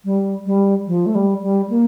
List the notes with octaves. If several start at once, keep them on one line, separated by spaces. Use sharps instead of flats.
G3
G3
F3
A3
G3
G3
A#3